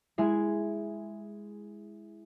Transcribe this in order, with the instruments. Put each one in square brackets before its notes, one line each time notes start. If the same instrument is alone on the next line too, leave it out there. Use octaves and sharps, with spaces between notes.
[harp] G#3 E4 G#4